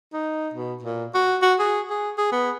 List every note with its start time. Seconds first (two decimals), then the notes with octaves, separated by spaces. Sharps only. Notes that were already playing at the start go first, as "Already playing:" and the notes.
0.13 D#4
0.53 B2
0.82 A#2
1.14 F#4
1.42 F#4
1.59 G#4
1.90 G#4
2.18 G#4
2.32 B3